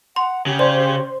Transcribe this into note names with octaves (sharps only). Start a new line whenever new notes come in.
F#5 C6
C#3 G4
C5 D5